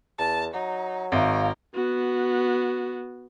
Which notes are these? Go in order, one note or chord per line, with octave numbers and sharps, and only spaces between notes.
E2 A5
F#3 D#4
G#1 A#4 E5 F5 C#6
B3 F#4